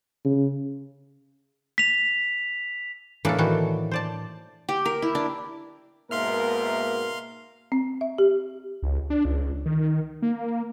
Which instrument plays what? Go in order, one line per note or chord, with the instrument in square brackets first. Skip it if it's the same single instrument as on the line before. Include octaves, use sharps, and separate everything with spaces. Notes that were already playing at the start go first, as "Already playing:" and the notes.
[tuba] C#3
[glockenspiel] B6 F7
[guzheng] A2 A#3 D4 [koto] E3 A4
[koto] D#3 E3 F#4
C5 D5 A5
[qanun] G4
A#4
E4
D4
[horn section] G#2 B2 A#4 [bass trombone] A#3 [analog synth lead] E5 [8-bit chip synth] F5 C6 F6
[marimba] C4
E5
G4
[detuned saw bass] C#2
D4
C#2
D#3
A#3